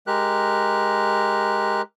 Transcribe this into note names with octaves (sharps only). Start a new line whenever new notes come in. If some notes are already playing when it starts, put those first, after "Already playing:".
G#3 G4 A#4 F#6